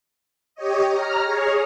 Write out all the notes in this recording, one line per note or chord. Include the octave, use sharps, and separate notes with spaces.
G4 C#5 D#5
A#5 F6
G#4 C#5